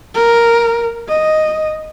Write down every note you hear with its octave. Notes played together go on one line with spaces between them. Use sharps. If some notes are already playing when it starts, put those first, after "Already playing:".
A#4
D#5